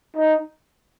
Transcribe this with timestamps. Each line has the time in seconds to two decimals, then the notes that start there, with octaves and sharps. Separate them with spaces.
0.16 D#4